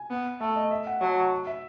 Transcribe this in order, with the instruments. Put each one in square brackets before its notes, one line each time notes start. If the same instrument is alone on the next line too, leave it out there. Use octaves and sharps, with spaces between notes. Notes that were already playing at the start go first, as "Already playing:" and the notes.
Already playing: [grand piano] G#5
[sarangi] B3
[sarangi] A3 [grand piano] A5
[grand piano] D#5
E5
F#5
[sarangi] F#3 [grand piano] A5
[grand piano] C#6
E5